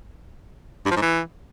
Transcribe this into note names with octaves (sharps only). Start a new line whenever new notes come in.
G2
F3
G#2
E3